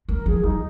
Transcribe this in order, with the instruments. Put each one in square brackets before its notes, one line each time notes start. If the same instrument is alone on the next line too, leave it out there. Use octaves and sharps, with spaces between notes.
[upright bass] G#3 [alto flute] A#4
[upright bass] F3 [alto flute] G#4
[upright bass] G3 [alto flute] D#4